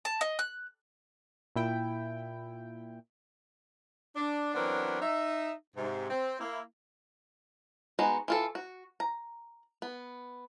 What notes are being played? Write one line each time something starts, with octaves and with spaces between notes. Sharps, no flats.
A5
D#5
F#6
A#2 E4 G5
D4
E3 F#3 B3 C4 D4 A#4
D#4 E5
G#2 C3
C4
A#3 E4
G#3 B3 D#4 F#4
E3 F4 A4
F#4
A#5
B3